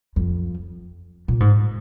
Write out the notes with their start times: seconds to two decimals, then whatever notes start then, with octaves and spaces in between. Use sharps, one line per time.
0.16 F2
1.28 A#2
1.40 G#2